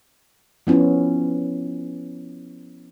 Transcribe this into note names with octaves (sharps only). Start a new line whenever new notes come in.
F3 B3 C#4 E4